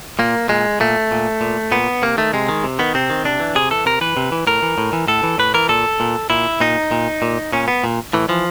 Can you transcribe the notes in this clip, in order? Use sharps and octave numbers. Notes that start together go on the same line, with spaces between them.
A#2 A#3
A#2 G#3
A#2 A3
A#2
A#2
A#2 B3
C3 A#3
D#3 A3
C3 G#3
D#3
C3
D#3 B3
C3 C4
D#3
C3 D4
E3
C3 G#4
E3 A4
C3 A#4
E3 B4
C3
E3
A2 A#4
E3
A2
E3
A2 A4
E3
A2 B4
E3 A#4
A#2 A4
A#2
A#2 E4
A#2 D#4
A#2
A#2
A#2 C#4
B3
A#2
A2 E3
E3 F3